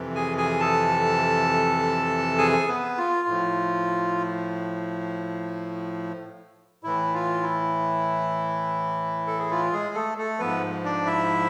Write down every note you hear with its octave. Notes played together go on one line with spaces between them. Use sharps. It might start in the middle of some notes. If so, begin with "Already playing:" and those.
Already playing: F2 C3 E3
G#4 G#5
G#4 G#5
A4 A5
G#4 G#5
B3 B4
F4
A2 F3
A2 E3 E4
F4
E4
A4
G#4
F4
G#3 G#4
A3 A4
A3 A4
G#2 F3 B3 B4
D4 D5
E4 E5